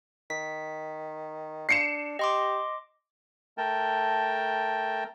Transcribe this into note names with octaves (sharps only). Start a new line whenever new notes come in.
D#3 B6
D4 C7 C#7 E7
G4 D#5 C6 D6
A3 A#4 G5 A5